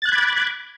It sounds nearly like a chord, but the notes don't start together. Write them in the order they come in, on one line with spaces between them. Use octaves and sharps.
A6 F#6 G#6 B5 D6